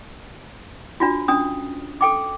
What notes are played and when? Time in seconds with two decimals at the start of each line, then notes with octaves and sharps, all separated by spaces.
1.00 D4 F4 F#4
1.28 C#4 D4 D#6
2.01 A4 G5 D6